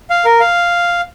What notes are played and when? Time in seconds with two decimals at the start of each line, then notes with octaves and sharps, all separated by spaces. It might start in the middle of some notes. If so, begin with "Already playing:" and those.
0.10 F5
0.25 A#4
0.40 F5